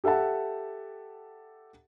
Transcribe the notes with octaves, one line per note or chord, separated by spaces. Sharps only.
G4 A4 E5 F#5 A5